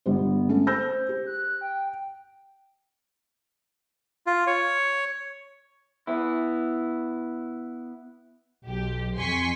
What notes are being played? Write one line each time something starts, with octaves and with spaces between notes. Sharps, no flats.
G1 G3 B3 C5
A3 C#4
C5 E6 G6 A#6
G4
F#6
G5
F4
C#5
B3 E4
B1 G4
F2 G#5 C6 C#6 B6